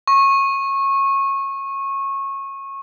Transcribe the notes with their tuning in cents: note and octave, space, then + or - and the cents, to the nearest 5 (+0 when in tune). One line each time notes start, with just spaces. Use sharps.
C#6 -20